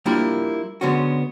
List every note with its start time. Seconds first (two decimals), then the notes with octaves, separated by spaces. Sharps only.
0.06 G3 A#3 D4 E4 F4
0.81 D3 G#3 B3 C#4 F#4